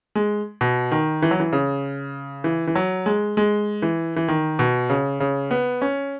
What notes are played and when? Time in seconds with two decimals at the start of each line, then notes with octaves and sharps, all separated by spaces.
0.15 G#3
0.61 B2
0.92 D#3
1.22 E3
1.31 F#3
1.40 E3
1.53 C#3
2.44 E3
2.67 E3
2.75 F#3
3.06 G#3
3.37 G#3
3.82 E3
4.16 E3
4.28 D#3
4.59 B2
4.90 C#3
5.20 C#3
5.51 B3
5.82 C#4